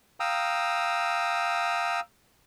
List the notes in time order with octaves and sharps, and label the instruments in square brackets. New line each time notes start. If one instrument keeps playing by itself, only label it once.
[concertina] F5 G5 A#5 D#6 E6